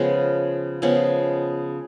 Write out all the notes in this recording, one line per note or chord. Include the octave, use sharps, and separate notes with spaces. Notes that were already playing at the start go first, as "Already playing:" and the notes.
Already playing: C#3 F3 G#3 B3
C#3 F3 G#3 B3